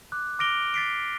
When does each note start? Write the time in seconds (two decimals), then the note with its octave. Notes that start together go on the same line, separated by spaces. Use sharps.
0.12 D6 F#6
0.39 D6 F6 A#6 D7 F7 G7
0.74 A6 B6 C7 D7